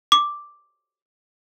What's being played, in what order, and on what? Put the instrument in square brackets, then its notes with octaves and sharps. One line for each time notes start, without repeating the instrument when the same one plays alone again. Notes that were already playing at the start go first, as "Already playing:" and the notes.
[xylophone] D6